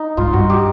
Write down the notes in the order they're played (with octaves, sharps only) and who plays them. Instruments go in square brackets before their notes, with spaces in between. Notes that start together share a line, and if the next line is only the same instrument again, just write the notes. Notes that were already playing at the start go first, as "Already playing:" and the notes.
Already playing: [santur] D#4
[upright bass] G#2 [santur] F4
[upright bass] G2 [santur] F#4
[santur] G4